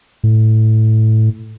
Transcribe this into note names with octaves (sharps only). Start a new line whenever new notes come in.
A2